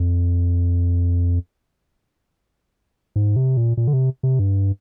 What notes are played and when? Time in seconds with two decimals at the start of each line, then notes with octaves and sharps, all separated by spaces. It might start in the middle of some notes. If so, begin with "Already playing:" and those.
Already playing: F2
3.16 G#2
3.36 C3
3.57 A#2
3.77 A#2
3.88 D3
3.93 C3
4.23 C3
4.39 G2